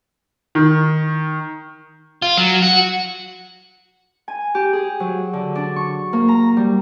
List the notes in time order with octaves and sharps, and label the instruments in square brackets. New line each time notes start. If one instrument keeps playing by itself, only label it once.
[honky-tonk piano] D#3
[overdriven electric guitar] F4
F#3
F#4
[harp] G#5
G4
G#4
F#3
D3
D4
C#6
A#3
A#5
G3